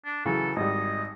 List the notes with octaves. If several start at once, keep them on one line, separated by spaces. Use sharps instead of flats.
D4
C#3 E3 F#3 A4
G#1 G3 D#5